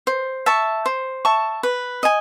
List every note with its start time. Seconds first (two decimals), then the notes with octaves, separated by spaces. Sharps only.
0.07 C5
0.46 E5 A5 C#6
0.86 C5
1.25 E5 A5 C#6
1.63 B4
2.03 D#5 G#5